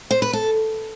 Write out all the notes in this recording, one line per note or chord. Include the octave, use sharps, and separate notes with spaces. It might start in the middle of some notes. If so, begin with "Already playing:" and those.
C5
B4
A4